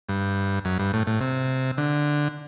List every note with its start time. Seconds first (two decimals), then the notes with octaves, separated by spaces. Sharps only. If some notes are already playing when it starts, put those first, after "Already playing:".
0.09 G2
0.65 F#2
0.79 G2
0.94 A2
1.07 A2
1.21 C3
1.78 D3